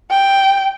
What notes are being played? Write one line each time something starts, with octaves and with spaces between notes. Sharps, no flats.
G5